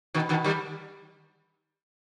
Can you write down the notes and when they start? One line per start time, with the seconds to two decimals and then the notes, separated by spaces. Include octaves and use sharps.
0.14 B2 D#3
0.29 B2 D#3
0.44 D#3 G3